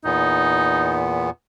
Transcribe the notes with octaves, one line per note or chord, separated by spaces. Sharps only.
E2 A#2 B3 D#4